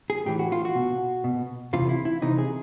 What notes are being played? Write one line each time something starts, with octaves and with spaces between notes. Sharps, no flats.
G#4
A2 E3 G4
F#4
F4
F#4
B2
B2
C3 E3 F4
E4
E4
C3 E3 D#4
G#4